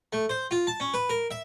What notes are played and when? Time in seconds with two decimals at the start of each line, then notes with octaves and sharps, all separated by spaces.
0.13 A3
0.29 C5
0.51 F4
0.67 A5
0.80 C#4
0.94 B4
1.09 A#4
1.31 E5